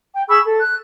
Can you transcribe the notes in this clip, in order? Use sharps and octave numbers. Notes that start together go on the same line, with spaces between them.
G5
G#4 B5 C#6 E6
A4
F#6